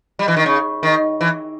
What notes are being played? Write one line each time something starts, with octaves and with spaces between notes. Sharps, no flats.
G3
E3
D#3
C#3
D#3
E3